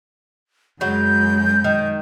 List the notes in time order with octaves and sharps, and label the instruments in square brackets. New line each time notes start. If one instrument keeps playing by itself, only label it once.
[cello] F#2 G#3 [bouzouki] C#3 F#3 [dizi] G6
[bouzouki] D#3